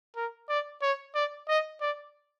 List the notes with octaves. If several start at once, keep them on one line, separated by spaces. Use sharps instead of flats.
A#4
D5
C#5
D5
D#5
D5